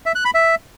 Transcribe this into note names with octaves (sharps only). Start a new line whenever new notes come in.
E5
F#6
B5
E5